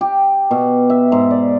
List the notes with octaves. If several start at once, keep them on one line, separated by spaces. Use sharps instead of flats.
G4
B2
E5
G#2
D5